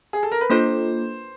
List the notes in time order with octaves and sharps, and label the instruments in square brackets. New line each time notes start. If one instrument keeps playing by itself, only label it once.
[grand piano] G#4
A4
A#4
B4
[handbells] A#3 D4 F4 A4 [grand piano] C5